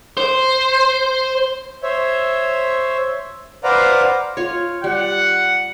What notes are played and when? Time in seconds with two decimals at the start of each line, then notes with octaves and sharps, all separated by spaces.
0.18 C5
1.83 C5 C#5 E5
3.64 B4 C5 D5 F5 F#5 A#5
4.37 F4 C#5
4.84 G3 F#5